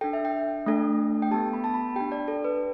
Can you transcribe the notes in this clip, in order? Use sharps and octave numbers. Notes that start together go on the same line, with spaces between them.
D4 A4 G5
E5
G5
A3 D4 A4
G5
B3 G4 A5
B5
A5
B5
D4 G4 G5
D5
A4
B4